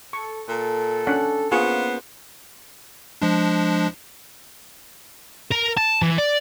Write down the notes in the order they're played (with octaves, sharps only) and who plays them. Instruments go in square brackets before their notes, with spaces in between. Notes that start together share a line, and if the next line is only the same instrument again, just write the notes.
[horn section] A4 [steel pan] C#6
[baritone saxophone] A#2 [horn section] A4
[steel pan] C#4 D4 F#5
[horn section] A#3 C#4 C5 [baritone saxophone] B3 [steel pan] F4 G#4 C#6
[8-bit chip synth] F3 G#3 D4
[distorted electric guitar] A#4
A5
E3
D5